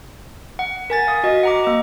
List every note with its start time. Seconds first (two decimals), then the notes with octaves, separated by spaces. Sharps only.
0.59 F#5
0.90 A#4 G#5 A6
1.07 F5 D#6
1.24 F#4 D#5
1.43 F#5 A#5 D6
1.64 A#3 D#5